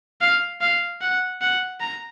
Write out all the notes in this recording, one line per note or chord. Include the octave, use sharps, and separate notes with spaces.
F5
F5
F#5
F#5
A#5